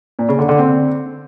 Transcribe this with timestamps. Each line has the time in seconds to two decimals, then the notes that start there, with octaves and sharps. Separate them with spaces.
0.19 A#2
0.29 C#3
0.39 D3
0.49 D3
0.59 C4